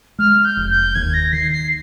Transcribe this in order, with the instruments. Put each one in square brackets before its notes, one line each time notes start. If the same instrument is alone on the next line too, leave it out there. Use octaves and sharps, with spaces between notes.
[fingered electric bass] G#3 [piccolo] F6
[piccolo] G6
[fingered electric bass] F1
[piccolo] G6
[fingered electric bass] D#2 [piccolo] G#6
[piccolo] A#6
[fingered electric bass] D#3 [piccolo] C7
[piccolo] C7